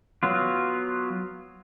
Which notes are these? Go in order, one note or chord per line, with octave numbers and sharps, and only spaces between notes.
F#3 B3 F4